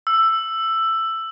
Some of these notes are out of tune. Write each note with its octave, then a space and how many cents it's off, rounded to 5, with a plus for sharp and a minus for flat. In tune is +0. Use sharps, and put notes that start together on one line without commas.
E6 +10